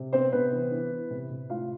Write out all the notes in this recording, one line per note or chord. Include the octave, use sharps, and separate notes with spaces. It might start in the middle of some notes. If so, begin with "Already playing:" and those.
Already playing: C3
B3 C4 C5
C3 B3 B4
E3
E3
E3
C3
C3
A2 F4 F5